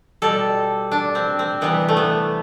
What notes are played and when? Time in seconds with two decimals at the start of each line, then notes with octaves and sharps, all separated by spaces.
0.22 B2 G3 A4
0.92 D4
1.15 C4
1.39 C4
1.61 C3 E3 G3 B3
1.88 A3
1.97 B3